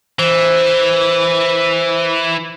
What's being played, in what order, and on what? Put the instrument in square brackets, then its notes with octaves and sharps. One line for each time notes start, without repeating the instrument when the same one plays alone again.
[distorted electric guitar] E3 [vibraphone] C5